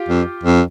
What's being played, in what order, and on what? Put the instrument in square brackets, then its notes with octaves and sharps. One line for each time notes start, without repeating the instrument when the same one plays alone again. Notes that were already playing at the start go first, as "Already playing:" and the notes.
Already playing: [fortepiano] F4 G4
[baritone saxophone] F2
F2